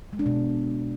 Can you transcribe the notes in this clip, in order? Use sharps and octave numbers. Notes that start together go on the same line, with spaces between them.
G#3
D4
B2